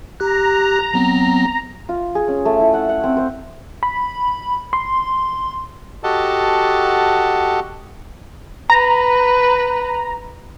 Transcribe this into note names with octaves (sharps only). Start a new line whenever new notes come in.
G4 A#5 F#6
F#3 B3 C4
F4
G#4
C#4
A3
E4
F#5
F#5
C4
C5
B5
C6
F#4 G4 A4 D#5 F#5 A5
B4 A#5